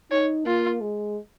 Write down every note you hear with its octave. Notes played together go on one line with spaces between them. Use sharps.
D#4 C#5
A#3 F4
G#3